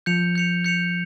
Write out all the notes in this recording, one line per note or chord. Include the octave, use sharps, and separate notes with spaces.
F3 G6 C#7 F7
G6 C#7 F7
G6 C#7 F7